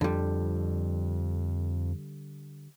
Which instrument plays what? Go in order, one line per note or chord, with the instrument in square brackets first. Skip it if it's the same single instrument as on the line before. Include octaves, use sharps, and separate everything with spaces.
[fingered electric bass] F2 F3 [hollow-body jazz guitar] D3 G3